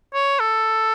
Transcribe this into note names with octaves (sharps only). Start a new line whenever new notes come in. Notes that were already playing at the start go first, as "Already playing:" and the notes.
C#5
A4